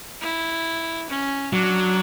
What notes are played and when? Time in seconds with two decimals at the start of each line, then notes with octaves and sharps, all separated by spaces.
0.21 E4
1.09 C#4
1.53 F#3 D4